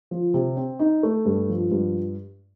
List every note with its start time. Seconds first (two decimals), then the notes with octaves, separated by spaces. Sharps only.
0.11 F3
0.34 C3
0.57 C4
0.79 D#4
1.03 A3
1.25 G2
1.49 F3
1.71 G2